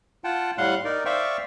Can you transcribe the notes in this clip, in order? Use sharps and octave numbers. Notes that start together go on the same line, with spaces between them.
F4 F#5 G5 A5
A2 G3 F5 F#5 C6 F#6
D#4 A#4 D5
C5 D5 E5 F5 G5 C#6